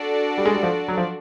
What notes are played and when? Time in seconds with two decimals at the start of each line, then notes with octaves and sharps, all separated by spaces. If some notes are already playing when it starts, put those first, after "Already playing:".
Already playing: D4 F#4 A4 D5
0.38 G3
0.46 G#3
0.55 G3
0.63 F3
0.88 F#3
0.97 F3